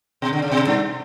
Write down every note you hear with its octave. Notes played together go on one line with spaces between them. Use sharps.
B2
D3
C#3
B2
G2